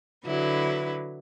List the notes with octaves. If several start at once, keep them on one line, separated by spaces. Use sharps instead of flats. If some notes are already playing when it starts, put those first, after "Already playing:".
D3 F#3 E4 B4